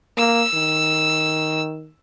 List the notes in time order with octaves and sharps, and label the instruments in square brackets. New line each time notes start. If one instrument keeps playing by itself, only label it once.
[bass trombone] A#3 [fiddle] E6
[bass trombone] D#3